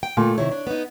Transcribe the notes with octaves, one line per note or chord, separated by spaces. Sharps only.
G5
A#2 A3
C3 D#3 E4 C#5
D4
B3 D#4